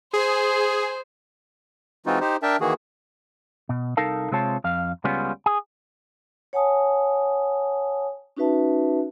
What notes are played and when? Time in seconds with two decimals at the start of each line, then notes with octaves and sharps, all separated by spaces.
0.13 G#4 C5
2.06 E3 G#3 C4 D#4 F4 F#4
2.21 D#4 G4 C5
2.43 D4 A#4 E5 G5 A5
2.61 D#3 E3 A#3 F#4 G#4
3.69 B2
3.97 C2 D#4 A4 A#4 F5 A5
4.31 C3 G#3 C4 F4 C#5 A5
4.64 F2 F5
5.04 C#2 C#3 G3 B3 C#4 F4
5.46 G#4
6.53 C#5 F#5 G#5 A5 D#6
8.37 C#4 D#4 F#4 B4 E5 A5